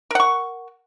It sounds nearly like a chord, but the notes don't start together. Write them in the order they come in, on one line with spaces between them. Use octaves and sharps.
A#4 F#5 C#6